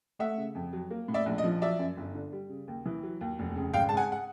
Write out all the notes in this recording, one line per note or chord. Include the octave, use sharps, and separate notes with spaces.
A3 E5 F#5
C#3
F2
F#3
A#3
A2
D5 E5
A#1
D#5
F3
F#3 D5 E5
F#2
G1
D3
G3
C#3
D#2
E3
F#3
D#2
F1
C#3
G#1 F5 G5
G#2 A5
F#5 G#5
F#5